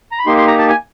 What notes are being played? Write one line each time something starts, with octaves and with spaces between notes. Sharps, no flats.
A#5
B5
A#3 D#4 G4 C6
C6
A#5
A5
G#5